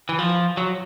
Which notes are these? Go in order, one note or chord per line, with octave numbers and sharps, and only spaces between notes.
E3
F3
F#3